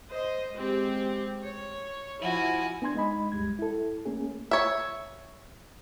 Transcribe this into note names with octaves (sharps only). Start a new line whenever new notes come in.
C5 D#5
G#3 C4 G4
C#5
F3 E4 F#4 G#5
B3 D4 G#5 C6 G#6
G#3 D#4 D#5 B5
C2 F#2 G3 G#3 G#6
E4 A4
A3 A#3 C#4 G#4
C#5 E5